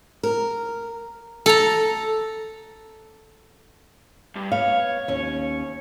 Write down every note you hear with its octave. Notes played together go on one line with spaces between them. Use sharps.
A#4
A4 A#5
G2
B3 C#5 F5
D#2 C#4